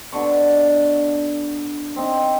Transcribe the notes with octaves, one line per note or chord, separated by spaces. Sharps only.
B2 D3 C#6
C4 D#4